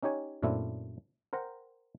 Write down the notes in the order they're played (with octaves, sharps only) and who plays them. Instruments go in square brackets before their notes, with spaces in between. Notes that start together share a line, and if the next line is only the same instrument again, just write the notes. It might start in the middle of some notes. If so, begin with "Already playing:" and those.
[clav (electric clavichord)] C#4 D#4 G4 C#5 G#5
F#2 A#2 A3 C4 D4 E4
A#4 C5 F#5 G5 A#5